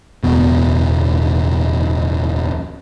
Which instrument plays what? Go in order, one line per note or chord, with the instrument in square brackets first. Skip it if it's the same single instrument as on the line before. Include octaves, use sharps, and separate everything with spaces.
[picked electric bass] D1 E2 B2